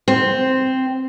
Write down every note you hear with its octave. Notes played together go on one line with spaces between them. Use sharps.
C4